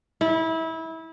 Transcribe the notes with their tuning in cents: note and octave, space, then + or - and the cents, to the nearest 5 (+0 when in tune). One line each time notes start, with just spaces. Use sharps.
E4 -25